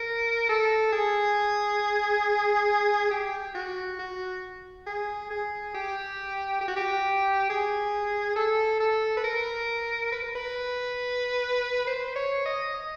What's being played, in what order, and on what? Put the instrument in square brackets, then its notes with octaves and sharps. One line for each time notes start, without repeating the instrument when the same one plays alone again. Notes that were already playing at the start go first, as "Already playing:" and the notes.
Already playing: [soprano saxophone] A#4
A4
G#4
G4
F#4
F#4
G#4
G#4
G4
G4
F#4
G4
G#4
A4
A4
B4
A#4
B4
A#4
B4
C5
C#5
D#5
D#5